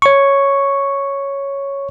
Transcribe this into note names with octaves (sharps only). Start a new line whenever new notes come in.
C#5 C#6